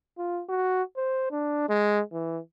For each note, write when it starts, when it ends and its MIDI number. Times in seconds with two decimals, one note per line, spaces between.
0.18 0.42 65
0.49 0.82 66
0.96 1.28 72
1.31 1.68 62
1.69 2.01 56
2.13 2.39 52